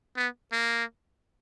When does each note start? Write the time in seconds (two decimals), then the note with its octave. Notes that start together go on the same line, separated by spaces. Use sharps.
0.17 B3
0.52 A#3